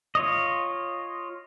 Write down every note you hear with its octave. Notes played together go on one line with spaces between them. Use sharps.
F4 C#5 D#5